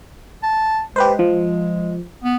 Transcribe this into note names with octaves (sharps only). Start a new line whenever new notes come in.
A5
G#3 G4 B4 C5
F3
B3